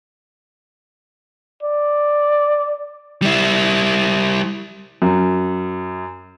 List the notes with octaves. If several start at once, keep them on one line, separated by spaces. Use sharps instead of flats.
D5
G3 E4
F#2